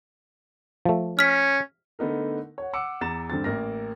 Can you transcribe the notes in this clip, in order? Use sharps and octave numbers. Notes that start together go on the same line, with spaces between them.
F3 A3
C#4 F6 B6
D3 A3 B3 D#4 A#4
C#5 F#5
F#5 D6 E6 C#7
E2 A#5 A6 E7
G2 D3 C4 A6
A1 A#3 A#4 A#6